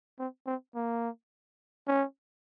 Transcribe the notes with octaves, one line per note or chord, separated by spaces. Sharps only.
C4
C4
A#3
C#4